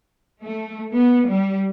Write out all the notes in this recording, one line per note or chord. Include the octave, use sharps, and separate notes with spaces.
A3
B3
G3